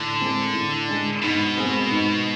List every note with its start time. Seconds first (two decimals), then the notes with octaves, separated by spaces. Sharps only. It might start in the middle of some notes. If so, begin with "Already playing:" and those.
Already playing: A2 D3
0.21 G#3 C4 G#4
0.54 A2
0.88 G#3 D4
1.23 G#2 B2
1.57 G#3 C4
1.91 G#2